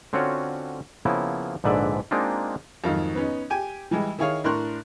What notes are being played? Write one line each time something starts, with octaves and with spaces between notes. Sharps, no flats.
D3 C4 C#4 F4 F#4 C#5
C#3 F3 A#3 B3 E4
A#1 G#2 D3 B4 D5 E5
G#3 A#3 C4 D4 D#4 F4
F2 G#2 D#3 F#3 F5
B3 C#4 D#4
G4 G5 G#5
E3 G3 G#3
D#3 E4 G#4 C#5 F5
A2 D4 A#4 C6 C#6 F#6